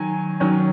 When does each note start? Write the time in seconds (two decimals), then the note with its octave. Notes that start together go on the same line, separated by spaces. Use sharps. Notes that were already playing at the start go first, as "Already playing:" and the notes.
Already playing: D#3 F#3 G#5
0.40 D#3 F#3 C#4